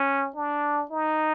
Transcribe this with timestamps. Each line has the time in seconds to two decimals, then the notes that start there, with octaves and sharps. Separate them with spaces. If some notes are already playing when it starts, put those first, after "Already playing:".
Already playing: C#4
0.36 D4
0.91 D#4